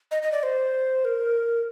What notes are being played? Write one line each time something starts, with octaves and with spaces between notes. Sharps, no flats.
D#5
D#5
D5
C5
A#4